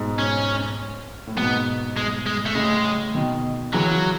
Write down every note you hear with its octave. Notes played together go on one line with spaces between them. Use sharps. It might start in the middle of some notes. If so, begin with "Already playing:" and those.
Already playing: G#2 B2
C#4
A2
G#2 B2 B3
G#3
G#3
A3
A2 C#3 G#3
B2 D#3
C#3 E3 F#3